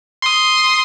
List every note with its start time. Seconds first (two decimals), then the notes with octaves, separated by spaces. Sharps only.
0.22 C6 D#6